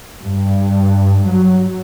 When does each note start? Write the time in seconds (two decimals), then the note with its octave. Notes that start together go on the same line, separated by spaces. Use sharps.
0.22 G2
1.30 F#3